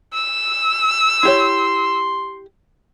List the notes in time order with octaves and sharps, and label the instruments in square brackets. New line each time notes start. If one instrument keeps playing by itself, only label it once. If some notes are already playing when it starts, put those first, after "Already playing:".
[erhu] E6
[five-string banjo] E4 G4 C#5 [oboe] C6